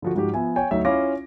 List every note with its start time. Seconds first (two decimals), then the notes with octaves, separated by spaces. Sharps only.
0.02 D3 F3 F#4
0.15 G#2 F3 F#4 G4
0.34 F3 B3 E5 G#5
0.56 C#5 G5 G#5
0.71 D2 F#3 D#4 E5
0.85 C#4 E4 F4 F5 D6 A#6